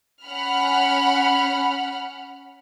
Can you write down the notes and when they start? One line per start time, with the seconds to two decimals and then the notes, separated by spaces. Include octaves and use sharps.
0.24 C#4 F#5 B5 F6